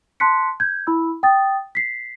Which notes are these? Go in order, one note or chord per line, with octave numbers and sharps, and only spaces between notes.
A5 C6 F#6 B6 C#7
G6 G#6
E4 B5 E6
G5 D#6 A6
B6 C7